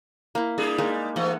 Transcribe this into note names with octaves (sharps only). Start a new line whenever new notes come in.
A#3 E4
G3 D4 G#4
G#3 A#3 D#4
E3 A3 D#5 F#5